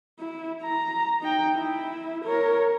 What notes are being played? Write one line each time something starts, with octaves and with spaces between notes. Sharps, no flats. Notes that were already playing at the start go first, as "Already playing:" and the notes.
E4
A#5
D#4 G5
E4
A#4 C#5